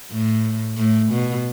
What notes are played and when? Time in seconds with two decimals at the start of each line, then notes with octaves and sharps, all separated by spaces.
0.11 A2
0.78 A2
1.12 B2